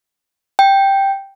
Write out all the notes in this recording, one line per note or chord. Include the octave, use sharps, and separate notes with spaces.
G5